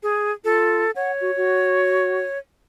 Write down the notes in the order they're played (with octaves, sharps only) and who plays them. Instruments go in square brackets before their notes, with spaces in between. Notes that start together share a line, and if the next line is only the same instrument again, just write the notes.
[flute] G#4
[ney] F4 [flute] A4
[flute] C#5 [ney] F#5
[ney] F#4
F#4